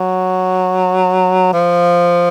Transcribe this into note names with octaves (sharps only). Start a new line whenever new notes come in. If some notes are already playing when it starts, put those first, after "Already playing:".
Already playing: F#3
F3